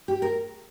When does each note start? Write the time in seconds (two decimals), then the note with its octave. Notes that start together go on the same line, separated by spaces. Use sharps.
0.08 G4
0.22 A#4